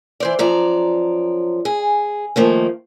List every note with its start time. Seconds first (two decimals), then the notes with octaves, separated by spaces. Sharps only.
0.20 E3 C5 D5
0.39 F#2 F3 D5 A#5
1.65 G#4
2.36 D#3 F3 A3 A#3